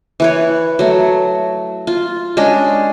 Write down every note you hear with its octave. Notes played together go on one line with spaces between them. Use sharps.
E3 B4 C#5
F#3 A3
F4
G#3 C#4 D4 G#4